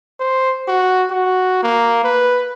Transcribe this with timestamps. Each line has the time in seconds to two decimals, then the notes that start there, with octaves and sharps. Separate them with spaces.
0.20 C5
0.68 F#4
1.11 F#4
1.63 A#3
2.04 B4